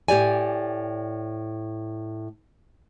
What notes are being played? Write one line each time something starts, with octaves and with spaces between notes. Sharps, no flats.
A2 G4 D5 G#5